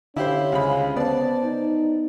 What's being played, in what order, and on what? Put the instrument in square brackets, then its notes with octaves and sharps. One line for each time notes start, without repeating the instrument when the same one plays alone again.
[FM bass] D3 [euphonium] C#4 [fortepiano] E4 G4 C5 [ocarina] F5
[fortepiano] C#2 G#3 B5
[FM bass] B3 [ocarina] C5 [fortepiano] D5 A5
[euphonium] D#4